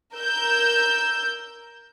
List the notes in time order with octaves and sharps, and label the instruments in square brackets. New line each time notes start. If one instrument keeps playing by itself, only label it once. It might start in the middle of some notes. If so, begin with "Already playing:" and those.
[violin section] A#4 E6 G6